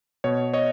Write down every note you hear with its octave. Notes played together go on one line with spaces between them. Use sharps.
B2 C#5
C#5 D#5